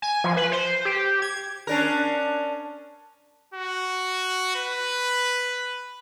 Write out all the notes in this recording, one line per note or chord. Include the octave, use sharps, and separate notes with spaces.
G#5
F3
B4
C5
G4
G#6
C#4 D4 A#4
F#4
B4